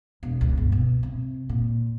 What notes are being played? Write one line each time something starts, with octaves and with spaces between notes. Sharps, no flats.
E1
C#2
G1
B2
C3
A#2